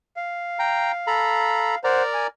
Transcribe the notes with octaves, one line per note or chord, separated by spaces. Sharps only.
F5
G5 A#5
A4 A#5 B5
A#4 C5 D5 F#5 A#5
G#5